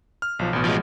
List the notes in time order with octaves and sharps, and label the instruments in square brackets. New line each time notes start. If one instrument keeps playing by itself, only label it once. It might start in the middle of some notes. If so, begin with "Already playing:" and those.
[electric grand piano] F6
B1 F3
A1 B2
[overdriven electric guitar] F3 G#3